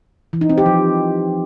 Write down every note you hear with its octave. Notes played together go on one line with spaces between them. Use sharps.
E3
D#4
C4
G4
F3